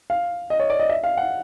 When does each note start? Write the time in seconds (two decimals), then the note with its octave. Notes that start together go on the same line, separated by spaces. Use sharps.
0.10 F5
0.50 D#5
0.60 C#5
0.70 D5
0.80 D#5
0.89 E5
1.04 F5
1.17 F#5